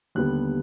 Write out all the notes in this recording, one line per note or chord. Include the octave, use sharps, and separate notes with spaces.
D#2 D3 G3 B3 F#6